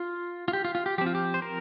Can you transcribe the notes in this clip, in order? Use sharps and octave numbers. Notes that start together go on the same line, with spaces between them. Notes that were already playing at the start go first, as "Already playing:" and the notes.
Already playing: F4
F4
G4
F4
F4
G4
F3 C4 G4
F4
G4
C5
A#4